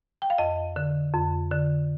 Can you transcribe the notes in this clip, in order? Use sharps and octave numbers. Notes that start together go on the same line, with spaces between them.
G5
F5
F2 D#5
D3
F2
D3